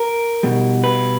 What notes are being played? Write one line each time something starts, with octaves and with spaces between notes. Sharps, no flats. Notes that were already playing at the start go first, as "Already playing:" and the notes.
Already playing: A#4
B2 G3
B4